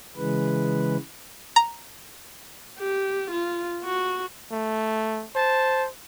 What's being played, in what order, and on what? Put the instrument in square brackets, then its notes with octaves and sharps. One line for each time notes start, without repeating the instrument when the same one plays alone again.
[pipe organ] C#3 E3 G#3 B4
[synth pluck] A#5
[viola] G4
F4
F#4
[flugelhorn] A3
[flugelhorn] C5 [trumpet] A5